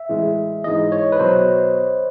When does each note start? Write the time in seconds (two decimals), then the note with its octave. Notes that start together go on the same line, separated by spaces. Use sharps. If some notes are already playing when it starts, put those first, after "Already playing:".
Already playing: E5
0.09 A2 E3 G#3
0.64 G#2 E3 G#3 D#5
0.92 C#5
1.12 B4
1.19 B2 F#3 C5